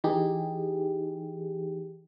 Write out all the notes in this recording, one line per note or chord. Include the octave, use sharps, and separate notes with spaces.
E3 D#4 G4 G#4